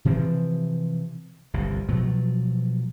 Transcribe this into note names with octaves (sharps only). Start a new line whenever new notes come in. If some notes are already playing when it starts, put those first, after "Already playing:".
C3 E3 F3 C4
G1 C2 A#2
B2 F3 F#3 A3